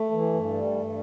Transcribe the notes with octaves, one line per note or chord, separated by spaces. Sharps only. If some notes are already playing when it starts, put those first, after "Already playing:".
Already playing: A3
E3
G2
G3
G2